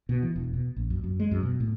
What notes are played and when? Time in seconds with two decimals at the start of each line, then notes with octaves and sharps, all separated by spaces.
0.09 B2
0.23 E3
0.36 E1
0.54 B2
0.76 A#1
0.90 F#2
1.04 F#2
1.20 G#3
1.31 F#2
1.43 B2
1.60 A2